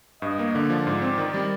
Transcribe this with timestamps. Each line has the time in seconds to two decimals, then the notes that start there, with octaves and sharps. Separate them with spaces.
0.22 G2 D#5
0.39 A#3
0.54 D3 D5
0.70 F3
0.87 G#2
1.02 C4
1.18 D#3
1.34 G3